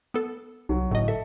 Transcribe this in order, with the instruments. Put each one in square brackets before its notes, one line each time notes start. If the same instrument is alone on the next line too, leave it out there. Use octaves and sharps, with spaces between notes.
[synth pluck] B3 A4
[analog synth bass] C2 [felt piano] F#3
[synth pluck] G1 D#5 [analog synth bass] A2
[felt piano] A4 [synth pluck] E5